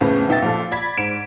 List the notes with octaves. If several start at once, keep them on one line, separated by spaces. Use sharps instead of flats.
F2 A2 C#3 B3
A#1 B2 D#4 E5 G5 A6
A#2 F3 F4 A4
D5 B5 G#6 B6
G#2 D7 E7